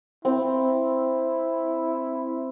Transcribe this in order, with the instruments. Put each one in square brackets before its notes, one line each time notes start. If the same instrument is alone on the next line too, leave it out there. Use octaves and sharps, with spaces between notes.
[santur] C4 [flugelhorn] E4